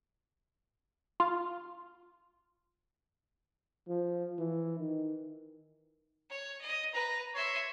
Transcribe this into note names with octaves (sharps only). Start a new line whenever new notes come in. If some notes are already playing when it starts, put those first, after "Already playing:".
F4
F3
E3
D#3
C#5
D#5
B4 A#5
C#5 E5 C6